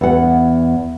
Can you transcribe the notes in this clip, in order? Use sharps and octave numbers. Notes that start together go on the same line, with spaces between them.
E2 F#5